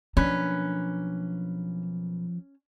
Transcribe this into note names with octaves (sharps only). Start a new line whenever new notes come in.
B1 F3 A#3 C#4 D4 B4